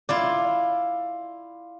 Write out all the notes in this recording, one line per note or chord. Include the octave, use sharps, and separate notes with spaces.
E4 F4 D5